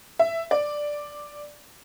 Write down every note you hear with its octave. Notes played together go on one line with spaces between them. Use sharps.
E5
D5